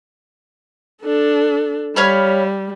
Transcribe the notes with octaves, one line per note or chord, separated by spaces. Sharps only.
D4 A4
G3 C#5 F5 B5